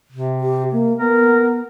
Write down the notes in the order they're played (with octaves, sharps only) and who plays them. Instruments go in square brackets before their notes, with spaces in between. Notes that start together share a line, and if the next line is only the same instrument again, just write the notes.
[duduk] C3
[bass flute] G4
A#3
[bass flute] B3 [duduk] A#4